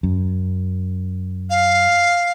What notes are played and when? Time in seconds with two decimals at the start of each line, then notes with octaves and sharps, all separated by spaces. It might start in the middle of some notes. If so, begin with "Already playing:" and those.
0.03 F#2
1.50 F5